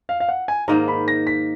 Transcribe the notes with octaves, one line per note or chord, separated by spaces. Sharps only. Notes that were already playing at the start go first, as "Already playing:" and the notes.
F5
F5
F#5
G#5
G#2 D#3 A#3 A#5
B5
A#6
B6